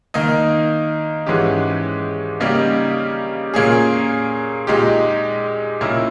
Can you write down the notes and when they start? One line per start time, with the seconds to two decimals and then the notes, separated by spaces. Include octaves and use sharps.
0.14 D#3 A#3 D#4
1.26 G#2 E3 G#3 C#4 G4
2.40 C#3 G3 A#3 D#4 G4
3.54 A#2 A#3 C#4 G#4
4.67 A#2 G#3 D#4 G4
5.81 A#2 A#3 C#4 E4